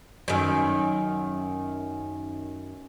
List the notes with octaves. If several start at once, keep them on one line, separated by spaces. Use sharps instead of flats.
F#2 D#3